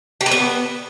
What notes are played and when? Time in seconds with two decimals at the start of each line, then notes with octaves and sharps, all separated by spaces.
0.21 G4
0.26 B4
0.31 B3